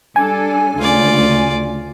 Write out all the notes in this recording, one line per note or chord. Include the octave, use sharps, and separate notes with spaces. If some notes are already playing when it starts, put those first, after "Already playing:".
G3 D4 A4 G#5
D2 C#3 F4 D5